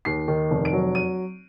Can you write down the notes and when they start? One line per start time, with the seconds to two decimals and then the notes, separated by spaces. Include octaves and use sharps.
0.05 D#2 C7
0.28 D#3
0.51 F1
0.65 D7
0.73 F#3
0.95 D#7